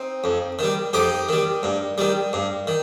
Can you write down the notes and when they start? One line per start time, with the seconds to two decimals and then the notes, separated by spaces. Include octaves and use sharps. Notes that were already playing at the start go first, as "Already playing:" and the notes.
Already playing: C4 D#4
0.24 F2
0.59 D#3 G3
0.93 F2 D#4 G4
1.29 D#3 G3
1.63 G2
1.98 D#3 G3
2.33 G2
2.67 D#3